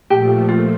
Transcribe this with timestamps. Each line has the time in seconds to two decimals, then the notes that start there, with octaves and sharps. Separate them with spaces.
0.10 A#2 F3 A3 G4
0.49 F4